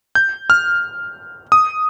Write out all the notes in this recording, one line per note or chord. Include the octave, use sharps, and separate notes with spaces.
G6
F6
D#6